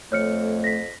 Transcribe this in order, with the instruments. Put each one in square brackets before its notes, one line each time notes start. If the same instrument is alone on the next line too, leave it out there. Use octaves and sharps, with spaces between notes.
[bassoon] F2 [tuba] A3 [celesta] C#5 F6 C#7
[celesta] A#6 B6